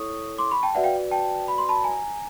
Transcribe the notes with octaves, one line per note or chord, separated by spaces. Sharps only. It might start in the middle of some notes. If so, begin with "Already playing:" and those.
Already playing: E4 A4 C#5 C#6 D#6
C6 D6
B5 C#6
G5 A5
F#4 B4 D5 E5 F#5
F5 G5
G5 A5
B5
C6
A5 B5
G#5 A#5